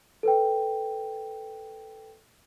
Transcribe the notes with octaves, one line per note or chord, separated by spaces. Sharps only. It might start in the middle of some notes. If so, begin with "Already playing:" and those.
A4 B4 G5